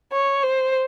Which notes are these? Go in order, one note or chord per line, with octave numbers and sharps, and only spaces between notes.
C#5
C5